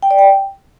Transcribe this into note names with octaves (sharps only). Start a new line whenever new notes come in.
G5
D5
G5